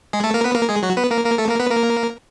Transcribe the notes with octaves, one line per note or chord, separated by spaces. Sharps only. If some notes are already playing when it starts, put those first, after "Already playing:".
G#3 G#4
A3 A4
A#3 A#4
B3 B4
A#3 A#4
G#3 G#4
F#3 F#4
B3 B4
A#3 A#4
A#3 A#4
A3 A4
A#3 A#4
B3 B4
A#3 A#4